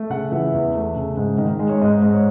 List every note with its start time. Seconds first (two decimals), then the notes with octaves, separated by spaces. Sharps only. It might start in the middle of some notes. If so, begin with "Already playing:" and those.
Already playing: A3
0.10 C#3 F#5
0.32 E3 E5
0.53 E2
0.75 A3
0.96 C#3
1.17 G#2
1.38 D#3
1.59 G#3
1.69 C#5
1.81 G#2 D#5
2.02 G#2
2.13 C#5